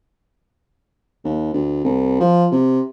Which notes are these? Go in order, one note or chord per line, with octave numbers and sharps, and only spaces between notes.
D#2
D2
C2
F3
C3